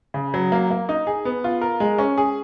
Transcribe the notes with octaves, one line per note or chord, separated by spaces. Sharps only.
C#3
F#3
A#3
A#3
D#4
G#4
B3
F4
A#4
G#3
C#4
G#4